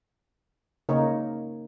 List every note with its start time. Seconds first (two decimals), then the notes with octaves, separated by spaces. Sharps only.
0.89 C#3 A#3 D#4 A#4 C#5